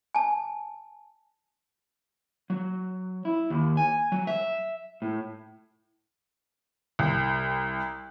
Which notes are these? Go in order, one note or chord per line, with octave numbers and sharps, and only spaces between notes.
G#5 A5
F#3
E4
D#2
G#5
F#3
E5
A2
C2